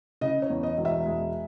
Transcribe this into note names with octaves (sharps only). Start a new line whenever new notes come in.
C#3 D#5
C#5
E2
D#5
E1
E5
G#3